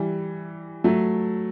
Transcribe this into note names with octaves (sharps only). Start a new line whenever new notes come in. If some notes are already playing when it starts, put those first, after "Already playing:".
Already playing: E3 G3
F#3 A3